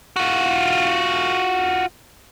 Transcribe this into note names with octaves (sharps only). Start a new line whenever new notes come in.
F4 F#4